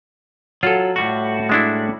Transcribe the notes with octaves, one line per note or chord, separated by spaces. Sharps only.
F#3 F4 A4
A2 G3 F#4
G#3 D4 E4